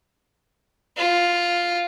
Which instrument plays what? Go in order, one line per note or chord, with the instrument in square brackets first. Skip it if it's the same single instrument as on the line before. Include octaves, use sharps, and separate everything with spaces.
[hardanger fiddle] F4